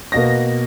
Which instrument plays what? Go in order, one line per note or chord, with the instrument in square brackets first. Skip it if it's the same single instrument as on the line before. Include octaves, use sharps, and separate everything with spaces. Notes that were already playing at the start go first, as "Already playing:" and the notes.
[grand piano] B2 A#3 A#6